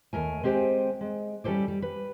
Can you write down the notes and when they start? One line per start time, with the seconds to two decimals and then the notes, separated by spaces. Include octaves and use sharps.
0.13 D#2 A3 A#4 G#5
0.43 G#3 C4 G4 C5 G5 G#5
1.01 G#3
1.44 G3 C#4 A4 C5 D5
1.68 G3
1.82 B4